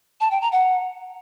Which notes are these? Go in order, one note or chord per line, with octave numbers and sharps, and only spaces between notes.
A5
G5
A#5
F#5